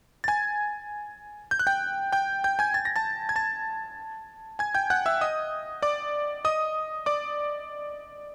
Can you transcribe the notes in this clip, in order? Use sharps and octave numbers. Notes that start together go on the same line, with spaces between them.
A6
G#5 G#6
G6
F#6
G5 G6
G5 G6
G5 G6
G#5 G#6
A6
A#6
A5 A6
G#6
A5 A6
G#5 G#6
G5 G6
F#5 F#6
E5 E6
D#5 D#6
D5 D6
D#5 D#6
D5 D6